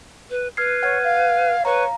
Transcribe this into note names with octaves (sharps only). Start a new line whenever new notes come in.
B4
B4 F6 G#6 C7
C#5 F#5 F6 G#6
F5
B4 C#5 F5 A#5